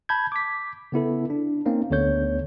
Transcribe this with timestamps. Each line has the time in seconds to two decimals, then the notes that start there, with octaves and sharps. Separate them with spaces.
0.09 A5 B5 G6 G#6
0.32 D6 B6
0.92 C#3 B3 E4 A4
1.30 D4
1.66 A#3 C4 C#4 D#4
1.90 D2 D3 B3 C#5 G6